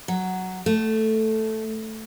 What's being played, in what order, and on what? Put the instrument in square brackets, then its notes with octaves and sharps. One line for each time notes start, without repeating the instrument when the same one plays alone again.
[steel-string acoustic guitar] F#3
A3